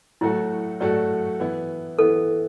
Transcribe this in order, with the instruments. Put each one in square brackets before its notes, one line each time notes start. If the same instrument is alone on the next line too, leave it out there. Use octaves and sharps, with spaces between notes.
[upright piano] A2 F#3 A3 F#4 A4 [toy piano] E4
[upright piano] A2 F#3 A3 F#4 A4 [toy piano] D5
[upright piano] E3 B3 E4
[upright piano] E3 B3 E4 [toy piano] A4